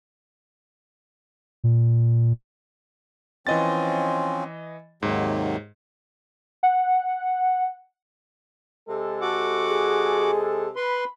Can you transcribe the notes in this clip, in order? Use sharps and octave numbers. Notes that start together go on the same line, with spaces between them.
A#2
E3 F3 C4 C#4 D#5 A6
D#2 G#2 C3 F#3
F#5
C3 G#3 A4
F#4 F#5 D6
G#4
B4 B5 C6